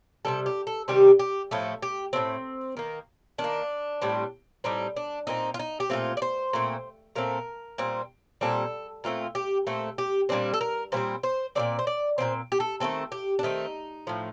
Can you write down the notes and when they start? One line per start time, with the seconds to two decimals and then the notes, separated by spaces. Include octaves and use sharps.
0.25 C3 D#3 G3 A4
0.46 G4
0.67 A4
0.88 C3 D#3 G3 G4
1.19 G4
1.51 A2 F3 A3 A4
1.83 G4
2.13 A2 F3 A3 C4
2.77 D#3 A#3
3.38 D#3 D4
3.44 A#3
4.02 A2 G3 C4
4.64 A2 G3 C4 D#4
4.96 D4
5.27 A#2 A3 C4 D#4
5.54 F4
5.59 D#4
5.80 G4
5.90 A#2 A3 C4 F4
6.17 D5
6.22 C5
6.53 A#2 A3 C4
7.16 A#2 A3 C4 A#4
7.78 A#2 G3 C4
8.41 A#2 G3 C4 A4
9.04 A#2 A3 C4 F4
9.35 G4
9.67 A#2 A3 C4 A4
9.98 G4
10.29 A#2 G3 C4 D4
10.54 A4
10.61 A#4
10.92 A#2 G3 C4 C5
11.23 C5
11.55 A#2 F3 C4 D5
11.79 C5
11.87 D5
12.18 A#2 F3 C4 C5
12.52 G4
12.60 A4
12.80 D#3 A3 C4 A4
13.12 G4
13.39 D4
13.43 D#3 A3 C4 D#4
14.07 A2 F3 A3